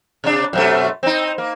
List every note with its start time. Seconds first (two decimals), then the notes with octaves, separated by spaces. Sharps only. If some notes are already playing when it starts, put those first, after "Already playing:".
0.24 C3 D4
0.53 F#2 B2 A3
1.03 C4 D#4
1.38 A#3